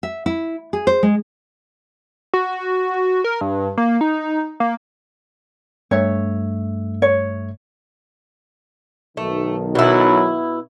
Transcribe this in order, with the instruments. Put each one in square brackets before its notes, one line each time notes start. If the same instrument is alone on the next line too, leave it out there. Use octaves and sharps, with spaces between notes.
[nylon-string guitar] E5
E4
G#4
C5
G#3
[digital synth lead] F#4
A#4
G2
A#3
D#4
A#3
[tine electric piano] G2 A3 E5 [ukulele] C#5
[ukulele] C#5
[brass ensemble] B1 D#3 [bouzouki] A3
[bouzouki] B2 E4 [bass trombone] F#3